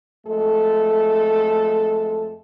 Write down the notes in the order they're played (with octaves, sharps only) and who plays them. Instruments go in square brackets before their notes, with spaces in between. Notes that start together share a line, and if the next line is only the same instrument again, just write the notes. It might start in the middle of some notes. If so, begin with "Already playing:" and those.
[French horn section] F2 G#3 A3 A4